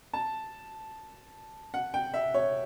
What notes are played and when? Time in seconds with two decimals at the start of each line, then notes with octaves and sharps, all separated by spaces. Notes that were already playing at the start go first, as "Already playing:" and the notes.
0.13 A5
1.74 F#5
1.94 G5
2.14 E5
2.34 C#5